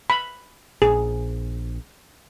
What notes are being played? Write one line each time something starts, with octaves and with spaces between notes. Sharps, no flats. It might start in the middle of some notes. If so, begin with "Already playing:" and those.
B5
A#1 G#4